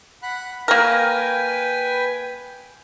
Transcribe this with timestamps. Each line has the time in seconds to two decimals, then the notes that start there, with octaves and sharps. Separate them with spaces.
0.23 F#5 B5 F#6
0.68 A#3 A#4 B4 G5 G#5